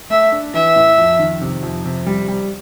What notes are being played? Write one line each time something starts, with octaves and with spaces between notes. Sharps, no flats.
A3 E5
D4
E3 E5
A2
F2
D#3
C3
F2
C3
G3
G3